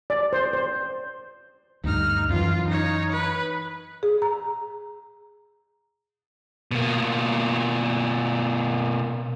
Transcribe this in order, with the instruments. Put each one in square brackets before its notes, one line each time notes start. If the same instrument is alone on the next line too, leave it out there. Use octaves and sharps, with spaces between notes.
[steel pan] D5
C5
C5
[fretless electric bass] D2 G2 [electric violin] D#4 F6
[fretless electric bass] F#2 E3 [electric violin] F4
[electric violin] D#4 C#5
B4
[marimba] G#4
A#5
[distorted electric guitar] B2 A#3